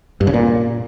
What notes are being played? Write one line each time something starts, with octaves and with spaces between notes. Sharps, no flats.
G2
C#3
A#2